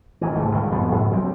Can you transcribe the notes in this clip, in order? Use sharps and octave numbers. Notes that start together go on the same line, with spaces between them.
D#3 E3
C2 G#2 A3
C#2 G2 D3 D#3
F2 F3 G3 B3
G#2
D2 F#3 C4